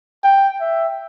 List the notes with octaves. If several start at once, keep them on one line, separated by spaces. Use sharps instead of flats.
G5
E5